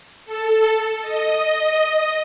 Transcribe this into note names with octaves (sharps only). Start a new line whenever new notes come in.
A4
D#5